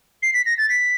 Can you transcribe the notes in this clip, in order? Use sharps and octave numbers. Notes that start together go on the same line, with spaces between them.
C7
B6
A#6
A6
B6